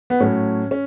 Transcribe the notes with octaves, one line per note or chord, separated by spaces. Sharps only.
B3
A2 F#3 A3 C#4
C#4